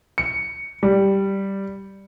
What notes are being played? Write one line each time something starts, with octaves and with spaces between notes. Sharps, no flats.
C#7
G3